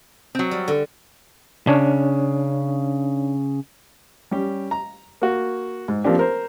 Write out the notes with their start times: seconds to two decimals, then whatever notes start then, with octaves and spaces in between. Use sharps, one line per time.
0.35 F#3 C4
0.51 G3
0.68 D3
1.67 C#3 D4 C#5
4.31 G3 C#4 G4
4.71 A#5
5.22 A#3 F#4
5.88 G#2
6.04 F3 A#3 C4 D4 G4
6.19 A#4 C5